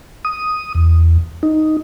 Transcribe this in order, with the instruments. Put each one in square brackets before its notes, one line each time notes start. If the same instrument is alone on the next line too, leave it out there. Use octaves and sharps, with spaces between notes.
[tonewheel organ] D#6
E2
D#4